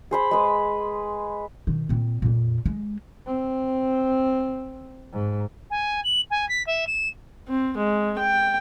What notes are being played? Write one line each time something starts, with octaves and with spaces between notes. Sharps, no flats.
G#4 C5 B5
G#3 B4
B2 D#3
A#2 C4
F2 A#2
G#3
C4
G#2
G#5
F#7
G#5
B6
E5
E7
C4
G#3
G5